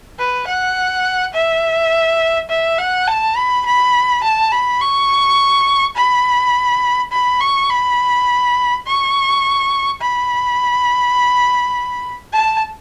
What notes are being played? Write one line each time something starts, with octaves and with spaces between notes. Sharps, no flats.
B4
F#5
E5
E5
F#5
A5
B5
B5
A5
B5
C#6
B5
B5
C#6
B5
C#6
B5
A5